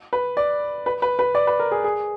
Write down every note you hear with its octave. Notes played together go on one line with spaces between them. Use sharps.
B4
D5
B4
B4
B4
D5
B4
A#4
G#4
G#4